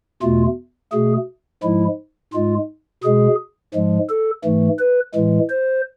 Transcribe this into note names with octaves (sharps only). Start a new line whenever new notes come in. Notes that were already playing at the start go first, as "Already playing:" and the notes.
E2 B2 A3 F4
B2 A3 G#4
G#2 F3 G#3 E4
G#2 G#3 F4
B2 G#3 G#4
G#2 F3 G#3
A4
G#2 E3 A3
B4
A2 E3 G#3
C5